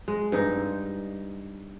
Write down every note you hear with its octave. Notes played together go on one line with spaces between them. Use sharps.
G#3
G2 D#4